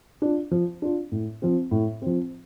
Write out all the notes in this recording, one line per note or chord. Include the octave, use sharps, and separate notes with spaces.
D4 F4
F3
D4 F4
A2
F3 C4
A2
F3 C4